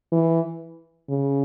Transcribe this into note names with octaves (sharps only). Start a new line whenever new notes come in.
E3
C#3